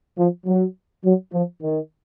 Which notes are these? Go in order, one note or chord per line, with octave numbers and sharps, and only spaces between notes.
F3
F#3
F#3
F3
D#3